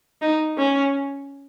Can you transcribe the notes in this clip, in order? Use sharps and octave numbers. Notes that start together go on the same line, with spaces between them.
D#4
C#4